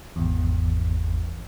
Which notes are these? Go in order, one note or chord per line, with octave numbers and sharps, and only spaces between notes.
G#1 E2